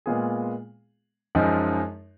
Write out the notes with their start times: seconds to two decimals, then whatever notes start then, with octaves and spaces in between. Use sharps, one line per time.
0.06 A#2 G#3 B3 F4 G#4
1.35 F#2 F3 G#3 D#4